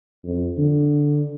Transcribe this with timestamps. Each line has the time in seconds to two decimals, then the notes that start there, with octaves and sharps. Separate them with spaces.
0.25 F2
0.57 D3